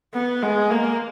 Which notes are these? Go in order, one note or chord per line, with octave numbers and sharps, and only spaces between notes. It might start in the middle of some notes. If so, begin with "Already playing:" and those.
B3
G#3
A#3